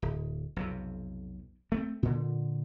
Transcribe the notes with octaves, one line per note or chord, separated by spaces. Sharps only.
D1
B1 F2 C3
A3 A#3 C4
A#2 D3